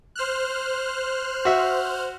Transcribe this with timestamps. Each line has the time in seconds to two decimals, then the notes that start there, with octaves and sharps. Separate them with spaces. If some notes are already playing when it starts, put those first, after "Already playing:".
0.16 C5 F6 F#6
1.45 F#4 E5